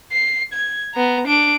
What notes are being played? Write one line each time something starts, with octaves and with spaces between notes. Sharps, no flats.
C7
G#6
B3 A#5
D4 D7